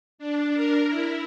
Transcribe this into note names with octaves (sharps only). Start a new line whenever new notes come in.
D4
A#4
E4